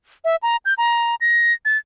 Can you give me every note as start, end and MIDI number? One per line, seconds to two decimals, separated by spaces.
0.25 0.36 76
0.43 0.57 82
0.65 0.74 91
0.78 1.15 82
1.21 1.53 94
1.65 1.77 93